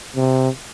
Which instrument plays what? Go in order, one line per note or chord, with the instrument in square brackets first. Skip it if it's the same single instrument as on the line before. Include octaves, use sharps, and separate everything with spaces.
[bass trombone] C3